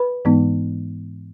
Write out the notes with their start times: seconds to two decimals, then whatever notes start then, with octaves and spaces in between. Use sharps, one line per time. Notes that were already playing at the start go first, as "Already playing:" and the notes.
Already playing: B4 B5
0.25 G#2 E3 G#3 B3 D#4